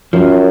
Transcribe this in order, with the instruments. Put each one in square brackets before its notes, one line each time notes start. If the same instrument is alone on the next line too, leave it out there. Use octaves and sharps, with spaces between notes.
[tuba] F#2 [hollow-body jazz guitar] F3